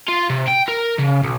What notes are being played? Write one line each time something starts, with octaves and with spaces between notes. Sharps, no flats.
F4
C3
G5
A#4
C#3
B1